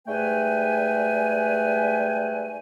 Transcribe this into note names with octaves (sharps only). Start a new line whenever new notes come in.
G#2 G3 A3 B4 G5 G#5